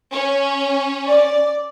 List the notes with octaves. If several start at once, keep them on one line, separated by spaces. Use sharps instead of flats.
C#4
D5